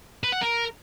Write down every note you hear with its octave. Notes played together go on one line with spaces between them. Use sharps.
B4
F#5
A#4